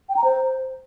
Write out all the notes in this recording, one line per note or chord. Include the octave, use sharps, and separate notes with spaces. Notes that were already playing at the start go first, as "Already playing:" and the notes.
G5
A#5
C5